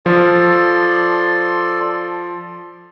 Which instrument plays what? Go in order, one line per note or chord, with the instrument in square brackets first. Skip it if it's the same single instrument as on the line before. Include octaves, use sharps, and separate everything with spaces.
[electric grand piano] F3 [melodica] A4 D5 C6